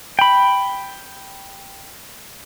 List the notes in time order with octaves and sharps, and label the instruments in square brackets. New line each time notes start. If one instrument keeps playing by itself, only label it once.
[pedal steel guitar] G5 B5